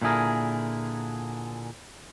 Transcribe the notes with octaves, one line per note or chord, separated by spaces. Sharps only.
A#2 D3 E4 G#4 A#4